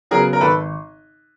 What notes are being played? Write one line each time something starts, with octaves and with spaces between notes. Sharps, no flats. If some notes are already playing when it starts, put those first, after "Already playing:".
C#3 F#3 B3 G#4 A#4
A#4
G#1 A4 B4